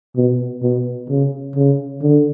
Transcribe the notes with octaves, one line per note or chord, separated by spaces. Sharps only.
B2
B2
C#3
C#3
D3